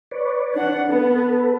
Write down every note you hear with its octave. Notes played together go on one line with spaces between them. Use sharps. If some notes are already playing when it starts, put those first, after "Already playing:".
B4 C#5 D5
D4 F#5
B3 A4 B4